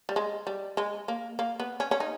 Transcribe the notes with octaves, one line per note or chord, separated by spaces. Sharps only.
G3
G#3
G3
G#3
A#3
A#3
B3
C#4
C#4
D#4